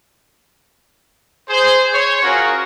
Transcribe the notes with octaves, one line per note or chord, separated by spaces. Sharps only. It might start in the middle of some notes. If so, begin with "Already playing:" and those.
G#4 C5
C#5
C#4 F4 F#4 G#4 A#4